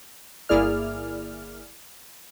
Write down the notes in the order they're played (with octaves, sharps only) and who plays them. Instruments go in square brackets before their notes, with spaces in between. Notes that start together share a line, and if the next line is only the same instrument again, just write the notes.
[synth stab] G1 A#3 E4 G#4 D5 F6